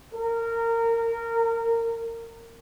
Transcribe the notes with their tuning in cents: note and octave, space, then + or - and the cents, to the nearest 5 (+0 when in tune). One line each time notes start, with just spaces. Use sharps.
A#4 -20